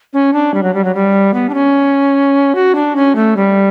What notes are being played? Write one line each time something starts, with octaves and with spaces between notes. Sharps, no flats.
C#4
D4
G3
F#3
G3
F#3
G3
B3
D4
C#4
F#4
D4
C#4
A3
G3